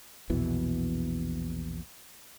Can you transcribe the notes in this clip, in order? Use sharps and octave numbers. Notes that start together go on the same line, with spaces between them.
A#1 E2 B2 E3